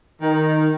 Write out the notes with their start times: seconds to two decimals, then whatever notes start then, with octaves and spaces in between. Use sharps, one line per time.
0.22 D#3